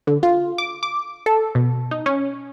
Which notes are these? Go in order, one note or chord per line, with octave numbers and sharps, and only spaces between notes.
D3
F4
D6
D6
A4
B2
D#4
C#4